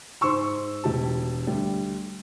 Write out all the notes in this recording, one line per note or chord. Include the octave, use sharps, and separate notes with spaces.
G#2 C5 C6 C#6 E6
E1 G4 A5
D2 G3